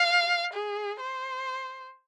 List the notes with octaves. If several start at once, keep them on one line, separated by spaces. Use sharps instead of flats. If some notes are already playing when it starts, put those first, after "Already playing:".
Already playing: F5
G#4
C5